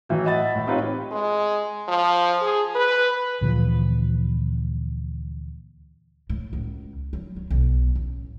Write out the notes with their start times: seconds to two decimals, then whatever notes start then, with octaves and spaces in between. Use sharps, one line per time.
0.09 A2 E3 F#3
0.26 D#5 E5 F#5 B5 A6
0.56 A2
0.67 C4 D#4 F4 G4 B4 C#5
1.11 G#3
1.88 F3
2.42 G#4
2.75 B4
3.41 D2 A#2 E3 F3
6.30 A2
6.53 C#2
7.13 F#3
7.36 F#3
7.50 B1
7.95 A1